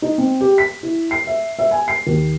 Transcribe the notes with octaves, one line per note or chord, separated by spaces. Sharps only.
D#4
C4
G4
B6
E4
C7
E5
E5
G#5
C7
D#2